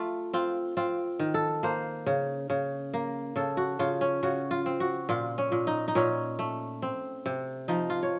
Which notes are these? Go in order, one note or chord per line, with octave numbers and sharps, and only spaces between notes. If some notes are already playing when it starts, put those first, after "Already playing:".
Already playing: A3 F4
C4 F4
C4 F4
D#3
A4
A#3 C5
C#3
C#3
A#3
C#3 A4
F#4
C#3 F4
C#4
C#3 F#4
F4
C4
F#4
A#2 F4
C#4
A#2
D#4
D#4
A#2 C#4
A3
C4
C3
F3 D#4
F4
C#5